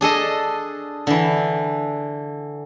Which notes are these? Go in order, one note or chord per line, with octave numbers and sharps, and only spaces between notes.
D4 G#4 A4 D#5
D3 E3